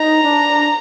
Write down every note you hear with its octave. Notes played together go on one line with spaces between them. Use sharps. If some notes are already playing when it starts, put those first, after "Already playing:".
Already playing: D#4 A#5
D4